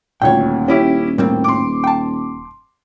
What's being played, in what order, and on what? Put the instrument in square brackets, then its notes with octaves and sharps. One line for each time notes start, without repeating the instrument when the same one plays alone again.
[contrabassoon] D#1 [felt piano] D2 A#2 [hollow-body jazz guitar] C#5 G5
[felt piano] C#4 E4 G4
[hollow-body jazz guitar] A2 G3 C4 [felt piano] A#3
[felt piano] C6 D6
[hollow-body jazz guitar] G5 A5